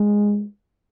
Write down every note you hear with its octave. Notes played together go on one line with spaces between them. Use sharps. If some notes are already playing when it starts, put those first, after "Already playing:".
Already playing: G#3